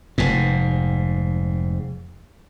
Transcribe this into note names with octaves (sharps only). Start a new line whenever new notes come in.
F1 G#2